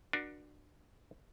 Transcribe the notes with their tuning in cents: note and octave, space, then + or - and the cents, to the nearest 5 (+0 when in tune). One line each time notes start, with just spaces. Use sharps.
D4 +20 F#4 -10 A#4 +30